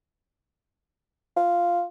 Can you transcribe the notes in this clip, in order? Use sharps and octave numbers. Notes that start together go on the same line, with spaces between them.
F4